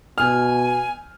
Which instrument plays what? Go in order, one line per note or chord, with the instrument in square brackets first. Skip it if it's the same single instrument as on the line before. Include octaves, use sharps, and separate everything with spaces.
[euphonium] B2 [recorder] G#5 [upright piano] F6